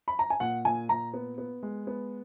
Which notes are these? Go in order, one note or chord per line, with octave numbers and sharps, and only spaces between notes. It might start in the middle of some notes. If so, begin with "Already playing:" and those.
B5
A#5
G#5
A#2 F#5
A#2 G#5
A#2 A#5
B3
B3
G#3
B3